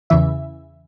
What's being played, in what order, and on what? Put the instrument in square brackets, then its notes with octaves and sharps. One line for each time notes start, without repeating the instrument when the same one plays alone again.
[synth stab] E2 C#3 E3 E5